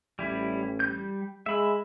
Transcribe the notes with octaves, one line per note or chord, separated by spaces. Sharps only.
A1 G3 E4
G3 G6
G#3 E5 B5